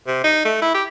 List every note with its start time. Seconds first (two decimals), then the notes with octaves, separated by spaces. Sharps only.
0.07 C3
0.24 D#4
0.45 A3
0.62 E4
0.74 G4